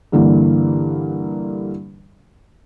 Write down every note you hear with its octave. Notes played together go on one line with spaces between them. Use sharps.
G2 D3 E3 A#3